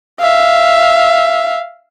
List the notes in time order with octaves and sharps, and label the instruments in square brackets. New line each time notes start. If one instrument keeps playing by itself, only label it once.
[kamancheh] E5 F5